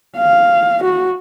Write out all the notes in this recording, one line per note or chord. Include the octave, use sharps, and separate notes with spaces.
F5
F#4